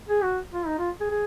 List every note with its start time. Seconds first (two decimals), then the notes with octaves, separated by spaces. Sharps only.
0.09 G#4
0.23 F#4
0.53 F4
0.67 D#4
0.79 F4
1.00 G#4
1.11 G#4